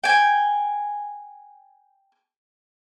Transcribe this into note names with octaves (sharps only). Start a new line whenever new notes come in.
G5 G#5